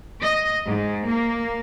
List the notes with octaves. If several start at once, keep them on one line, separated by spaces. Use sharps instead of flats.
D#5
G#2
A#3